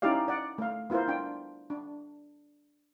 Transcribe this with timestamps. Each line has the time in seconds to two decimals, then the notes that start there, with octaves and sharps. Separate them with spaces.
0.02 C#4 D#4 E4 G4 D5 F5
0.28 D5 F#5
0.58 A3 F5
0.90 B3 E4 F4 A#4 C5
1.08 D4 G5
1.70 D4